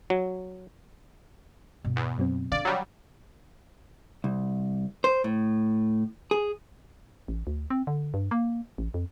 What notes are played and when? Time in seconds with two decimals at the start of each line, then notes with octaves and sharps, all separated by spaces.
0.10 F#3
1.85 G2 B2
1.96 E2
2.18 F#2 F#3 C4
2.52 D3 D5 F5
2.65 F#3 G3
4.24 C2
5.04 C5
5.24 A2
6.31 G#4
7.28 A1
7.47 D2
7.70 C4
7.87 D3
8.14 G2
8.31 A#3
8.78 A1
8.94 F2